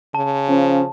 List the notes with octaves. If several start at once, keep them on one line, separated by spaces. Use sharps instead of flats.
C#3 A5
F3 C#4